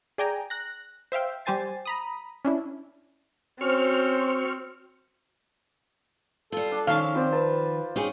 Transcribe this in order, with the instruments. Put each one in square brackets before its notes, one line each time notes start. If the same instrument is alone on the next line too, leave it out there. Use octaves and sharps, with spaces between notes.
[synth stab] G#4 D5 G5 G#5 A#5
F#6 A#6
C5 E5 F5 G5
G3 G4 C5 G#5 A6 C7
A#5 B5 D#6
C#4 D4 E4
[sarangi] C4 [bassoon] C#4 [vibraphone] F#4 [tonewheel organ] C5 C#6 F6
[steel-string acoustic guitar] G3 F4 [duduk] A4
[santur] D4
[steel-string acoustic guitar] D#3 F3 [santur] C#4 [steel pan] F5
[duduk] C4 [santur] F4 C5 D5
[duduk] B4 [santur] A5
[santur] C#4 C#6 [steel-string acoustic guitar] D#4 G4 G#4